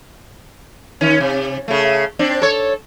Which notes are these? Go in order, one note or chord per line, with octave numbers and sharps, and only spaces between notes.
D#3 C#4
C3
C#3 A3
C4 D4
A4 C#5